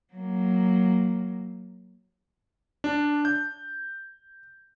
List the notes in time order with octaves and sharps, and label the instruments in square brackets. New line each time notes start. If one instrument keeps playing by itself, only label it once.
[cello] F#3 A#3
[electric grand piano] D4
G6